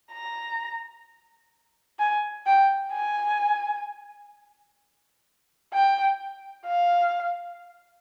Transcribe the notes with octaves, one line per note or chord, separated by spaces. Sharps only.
A#5
G#5
G5
G#5
G5
F5